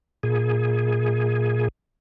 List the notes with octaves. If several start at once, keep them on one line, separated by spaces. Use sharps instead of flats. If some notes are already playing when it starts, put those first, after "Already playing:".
A#2 G#4